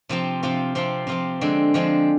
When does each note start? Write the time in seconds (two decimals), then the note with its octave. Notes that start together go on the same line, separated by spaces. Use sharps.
0.09 C3 F3 C4 F4
0.43 C3 F3 C4 F4
0.75 C3 F3 C4 F4
1.07 C3 F3 C4 F4
1.41 D3 F3 G#3 C4
1.74 D3 F3 G#3 C4